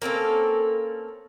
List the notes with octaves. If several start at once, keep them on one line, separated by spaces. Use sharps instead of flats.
A#3 C4 C#4 A4